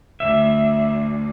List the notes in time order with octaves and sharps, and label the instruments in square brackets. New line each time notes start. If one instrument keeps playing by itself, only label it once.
[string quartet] D2 [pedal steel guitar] E5